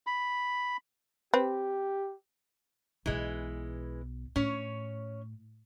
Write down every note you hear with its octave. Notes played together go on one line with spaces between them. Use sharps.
B5
C4 G4 B4
B1 B2 E3 G#3
A2 C#4 C#5